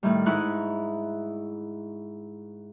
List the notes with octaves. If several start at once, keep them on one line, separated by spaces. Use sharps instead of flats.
A2 D#3 G3
G#2 D#4 E4 C#6 F#6